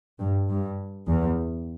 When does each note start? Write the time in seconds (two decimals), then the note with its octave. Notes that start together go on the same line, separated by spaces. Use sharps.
0.20 G2
0.49 G2
1.07 E2